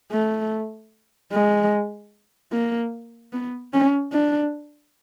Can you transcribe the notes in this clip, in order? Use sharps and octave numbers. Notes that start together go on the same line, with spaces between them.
A3
G#3
A#3
B3
C#4
D4